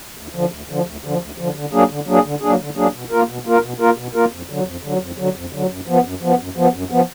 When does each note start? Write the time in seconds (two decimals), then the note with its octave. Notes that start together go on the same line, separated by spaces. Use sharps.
0.17 D2
0.35 D3 F3
0.52 D2
0.69 D3 F3
0.86 D2
1.04 D3 F3
1.21 D2
1.38 D3 F3
1.56 D3
1.73 F#3 A#3 D4 G#4
1.90 D3
2.07 F#3 A#3 D4 G#4
2.25 D3
2.42 F#3 A#3 D4 G#4
2.59 D3
2.76 F#3 A#3 D4 G#4
2.94 B2
3.11 A#3 F4 A#4
3.28 B2
3.46 A#3 F4 A#4
3.63 B2
3.80 A#3 F4 A#4
3.97 B2
4.15 A#3 F4 A#4
4.32 F2
4.49 D3 F#3
4.66 F2
4.83 D3 F#3
5.01 F2
5.18 D3 F#3
5.36 F2
5.53 D3 F#3
5.70 F#2
5.87 F3 B3
6.04 F#2
6.22 F3 B3
6.39 F#2
6.56 F3 B3
6.74 F#2
6.91 F3 B3